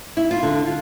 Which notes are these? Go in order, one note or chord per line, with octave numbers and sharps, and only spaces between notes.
E4
F4
D3
F4